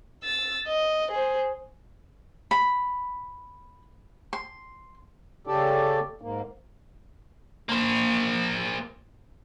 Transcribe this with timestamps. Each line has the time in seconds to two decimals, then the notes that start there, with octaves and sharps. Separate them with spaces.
0.23 E6 A6
0.67 D#5
1.11 G#4 C5
2.51 B5
4.33 C6
5.47 C#3 G4 A4 D5
6.22 G#2 A#3
7.69 A#3 C5